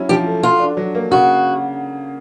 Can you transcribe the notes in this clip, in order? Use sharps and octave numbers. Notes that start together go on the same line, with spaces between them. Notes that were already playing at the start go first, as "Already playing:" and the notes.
Already playing: F#3 C#4 E4
F3 G4
A3
F4 F#4
D4
F#3
A#3
C#3 F#4